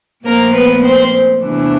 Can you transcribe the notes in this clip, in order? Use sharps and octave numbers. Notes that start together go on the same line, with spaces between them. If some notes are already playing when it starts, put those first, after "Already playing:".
A#2 F3 A3 A#3 C4 A#4
B3 B4
C4 C5
E2 C3 E3 A3 D4